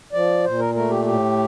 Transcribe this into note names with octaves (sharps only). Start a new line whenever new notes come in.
F3 D5
A#2 C5
A#4
A3 A#4
G4
A2 G4